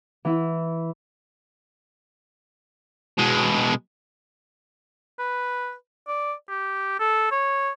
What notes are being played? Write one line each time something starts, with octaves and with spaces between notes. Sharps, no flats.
E3 E4
B2 G#3
B4
D5
G4
A4
C#5